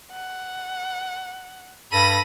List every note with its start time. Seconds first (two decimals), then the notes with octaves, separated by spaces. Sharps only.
0.12 F#5
1.92 G2 A4 B5 A#6 D#7